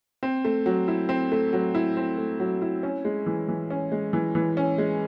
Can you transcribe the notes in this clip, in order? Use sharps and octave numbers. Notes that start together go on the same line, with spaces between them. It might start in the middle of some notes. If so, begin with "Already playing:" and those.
C4
A3
F#3
E4
C4
A3
F#3
E4
C4
A3
F#3
E4
C#4
G#3
E3
E3
C#4
G#3
E3
E3
C#4
G#3